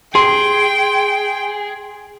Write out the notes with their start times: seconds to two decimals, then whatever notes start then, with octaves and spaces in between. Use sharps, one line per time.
0.15 G#4 G5 C6